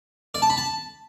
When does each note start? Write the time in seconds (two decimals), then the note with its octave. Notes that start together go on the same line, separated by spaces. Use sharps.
0.34 D5
0.42 A5
0.50 B5
0.57 A5